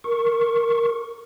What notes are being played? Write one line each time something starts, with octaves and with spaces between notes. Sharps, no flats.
A#4 C#6